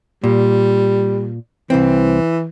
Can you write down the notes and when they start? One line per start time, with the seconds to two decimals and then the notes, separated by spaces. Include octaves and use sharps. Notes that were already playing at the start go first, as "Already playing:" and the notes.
0.24 A#2 G3
1.70 C2 E3 C4